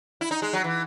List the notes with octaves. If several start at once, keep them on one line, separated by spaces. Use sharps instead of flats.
E4
D#4
G#3
F#3
E3